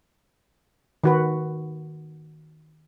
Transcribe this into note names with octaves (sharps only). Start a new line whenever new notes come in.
D#3 F#4 B4